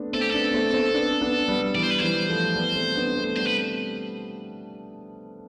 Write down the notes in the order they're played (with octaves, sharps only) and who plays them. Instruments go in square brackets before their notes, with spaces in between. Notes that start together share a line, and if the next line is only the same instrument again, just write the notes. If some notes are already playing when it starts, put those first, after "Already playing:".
Already playing: [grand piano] A3 B3 C4 D4
[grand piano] A3 C4 [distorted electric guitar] A4
[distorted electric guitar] G4
[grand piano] B3 D4 [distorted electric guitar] A4
[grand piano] A3 C4
A3 C4
B3 D4
B3 D4
G3 B3
[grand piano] E3 G3 [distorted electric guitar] D5
[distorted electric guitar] C5
B4
[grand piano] E3 G3 [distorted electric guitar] C5
[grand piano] F3 A3
G3 B3
A3 C4
B3 D4
A3 C4
[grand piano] G3 B3 [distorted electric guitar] C5
[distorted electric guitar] B4